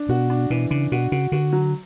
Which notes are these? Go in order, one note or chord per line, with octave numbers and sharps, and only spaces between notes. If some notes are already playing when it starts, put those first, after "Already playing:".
Already playing: D4
B2 F#4
D4
B2 E3
C#3 D4
B2 F#4
C#3 F#4
D3 F#4
F#3